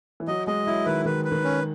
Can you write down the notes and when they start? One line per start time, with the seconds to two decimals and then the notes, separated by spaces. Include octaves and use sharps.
0.20 E3
0.28 F#3 D#5
0.47 G#3 D#5
0.67 F#3 E4
0.86 D#3 B4
1.05 D#3 B4
1.25 B4
1.32 D#3
1.44 C#4